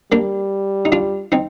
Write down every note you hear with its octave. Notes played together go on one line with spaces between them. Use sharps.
G3 A#3 D4
D#4
D4 F4
C4 D#4